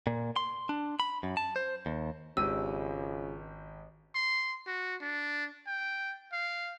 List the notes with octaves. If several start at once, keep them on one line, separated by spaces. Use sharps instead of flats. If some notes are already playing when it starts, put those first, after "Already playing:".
A#2
C6
D4
B5
F#2
A5
C5
D#2
G#1 C#2 G4 E6 D#7
C6
F#4
D4
G5
F5